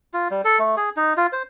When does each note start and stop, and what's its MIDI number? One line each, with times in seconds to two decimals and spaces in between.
0.13 0.28 65
0.31 0.42 55
0.45 0.58 69
0.59 0.76 57
0.77 0.90 68
0.97 1.13 63
1.17 1.26 65
1.33 1.43 72